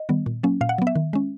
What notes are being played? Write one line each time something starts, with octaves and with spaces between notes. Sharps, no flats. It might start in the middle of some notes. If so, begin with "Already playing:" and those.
Already playing: D#5
D#3 G3 B3
A#2
F#3 A#3 C#4
A#2 F5
F#5
F#3 B3
E5
D#3
G#3 C#4